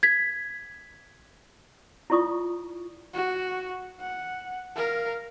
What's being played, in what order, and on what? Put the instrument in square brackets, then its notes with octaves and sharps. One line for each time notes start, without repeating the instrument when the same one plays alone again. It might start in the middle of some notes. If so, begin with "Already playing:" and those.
[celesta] G#6 B6
[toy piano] E4 F4 D5 C#6 D#6
[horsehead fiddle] F#4
F#5
A#4 F5